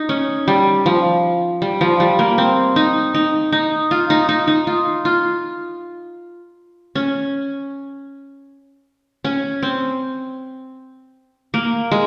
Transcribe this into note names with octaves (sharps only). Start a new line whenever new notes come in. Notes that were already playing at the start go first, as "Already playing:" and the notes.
Already playing: D#4
C#4
G3
F3
G3
F3
G3
A#3
C4
D#4
D#4
D#4
F4
D#4
D#4
D#4
F4
F4
C#4
C#4
C4
A#3
G#3